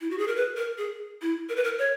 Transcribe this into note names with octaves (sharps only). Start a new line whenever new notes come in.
E4
F#4
G#4
A#4
B4
A#4
G#4
E4
A#4
B4
A#4
C#5